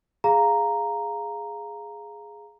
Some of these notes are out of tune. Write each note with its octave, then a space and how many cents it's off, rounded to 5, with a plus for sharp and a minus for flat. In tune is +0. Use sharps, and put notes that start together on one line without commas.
G#4 +0 F5 +0 A#5 -5